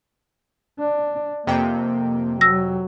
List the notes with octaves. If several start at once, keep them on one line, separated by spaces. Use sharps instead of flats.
D4
F2 C3 A#3 G5
F#3 E6 A#6